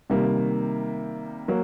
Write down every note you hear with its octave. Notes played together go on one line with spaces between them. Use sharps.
C3 D#3 G3 A#3
F#3 A#3